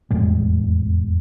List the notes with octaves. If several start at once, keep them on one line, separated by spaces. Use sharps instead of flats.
F1 E2 A2 G#3